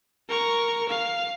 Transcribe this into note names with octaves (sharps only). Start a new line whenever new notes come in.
A#4 C#6
F5